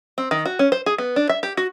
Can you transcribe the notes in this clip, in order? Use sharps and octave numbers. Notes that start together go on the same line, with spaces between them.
C4
D#3
F#4
C#4
C5
G#4
B3
D4
E5
G4
F#4